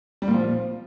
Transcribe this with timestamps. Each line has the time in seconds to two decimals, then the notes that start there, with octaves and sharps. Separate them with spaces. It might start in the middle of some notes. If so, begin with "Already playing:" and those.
0.22 G3
0.28 A#2
0.34 F3